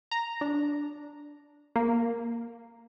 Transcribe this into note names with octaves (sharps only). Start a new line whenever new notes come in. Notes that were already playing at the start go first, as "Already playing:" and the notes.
A#5
D4
A#3